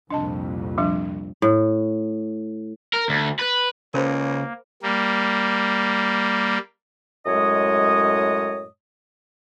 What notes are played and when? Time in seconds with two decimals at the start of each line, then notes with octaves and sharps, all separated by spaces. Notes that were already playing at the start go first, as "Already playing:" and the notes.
0.10 C2 F2 A#2 D4 D#5 A5
0.78 F3 G3 D4
1.42 A2
2.94 A#4
3.09 D2
3.39 B4
3.94 C#2 C#3 A#3 A#4 C5 B5
4.83 G3 A#3
7.27 F#2 A2 G#3 C#5 D#5 D#6